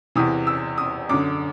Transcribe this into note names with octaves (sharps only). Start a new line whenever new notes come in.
E2 C3 E3 D#6
E6
D#6
F#2 D3 D6